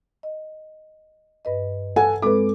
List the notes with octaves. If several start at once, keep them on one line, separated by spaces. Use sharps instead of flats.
D#5
G2 B4 D#5
A4 F#5 G#5
G#3 C4 A4 B4 D6